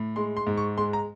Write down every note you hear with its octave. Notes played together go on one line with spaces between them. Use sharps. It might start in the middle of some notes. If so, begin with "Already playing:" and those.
Already playing: A2
G#3 C6
C6
G#2
C#6
G#3 C6
A#5